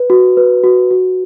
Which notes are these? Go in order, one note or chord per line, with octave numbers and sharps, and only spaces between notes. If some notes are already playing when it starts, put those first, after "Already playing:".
Already playing: B4
F#4
B4
F#4
F#4